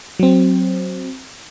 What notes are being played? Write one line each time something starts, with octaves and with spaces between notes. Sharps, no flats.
F#3 C4